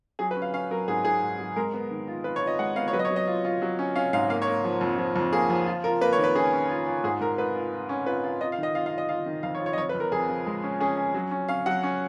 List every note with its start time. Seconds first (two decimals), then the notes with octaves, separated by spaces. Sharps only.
0.19 F#3 G#4
0.31 B4
0.36 C#4
0.42 F5
0.54 C#4 F5
0.71 F#3 A#4
0.88 G#2 G#4
1.05 G#2 G#4
1.22 G#2
1.39 F#3
1.56 G#3 A#4
1.73 B3
1.91 D#3
2.08 F4
2.24 F4 B4
2.36 C#5
2.42 F4
2.47 D#5
2.59 G#3 F#5
2.76 B3 F5
2.88 C#5
2.93 F#3 B4
2.99 D#5
3.05 C#5
3.10 F#3
3.16 D#5
3.28 F4
3.45 F4
3.62 F#3
3.79 C#4
3.96 C#4 F5
4.13 G#2 F5
4.30 A#3 F5
4.42 C#5
4.47 A#3
4.64 F3
4.81 F2
4.98 F3
5.16 F2
5.33 A#3 G#4
5.50 F3
5.66 F4
5.84 F4 A#4
6.01 A#3 B4
6.13 C#5
6.18 D#3
6.24 B4
6.35 C#4 G#4
6.53 C#4
6.70 F4
6.86 F4
7.04 G#2 G#4
7.20 G#2 A#4
7.38 G#2 B4
7.55 F4
7.72 F4
7.89 C#4
8.06 F4 B4
8.24 F4
8.41 F4 D#5
8.52 F5
8.58 D#3 D#5
8.75 F4 F5
8.86 F5
8.92 F4
8.98 D#5
9.09 F4 F5
9.26 D#3
9.43 F2 F5
9.55 C#5
9.60 F4
9.66 C#5
9.73 D#5
9.77 F2 C#5
9.89 B4
9.95 F2
10.00 A#4
10.12 F2 G#4
10.29 F3
10.47 G#3
10.63 C#4
10.81 C#4 G#4
10.97 C#4
11.14 F#3
11.31 C#4
11.49 C#4 F5
11.66 F#3 F#5
11.83 C#4